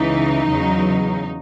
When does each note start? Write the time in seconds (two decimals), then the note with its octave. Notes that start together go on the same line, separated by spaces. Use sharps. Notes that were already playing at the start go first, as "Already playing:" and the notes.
Already playing: C#2 C#3 E3 D#4
0.47 E2 C#3 F#3